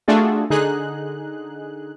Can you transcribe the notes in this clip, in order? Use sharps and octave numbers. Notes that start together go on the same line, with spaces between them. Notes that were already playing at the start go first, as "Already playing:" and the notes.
A3 D4 F4 F#4 G#4 A4
D3 D#4 G#4 F#6